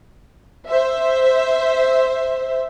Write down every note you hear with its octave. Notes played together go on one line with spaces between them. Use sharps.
C5 E5